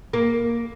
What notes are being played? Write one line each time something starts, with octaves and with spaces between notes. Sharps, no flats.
A#3